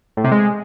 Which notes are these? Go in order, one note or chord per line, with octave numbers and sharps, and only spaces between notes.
A2
C3
G#3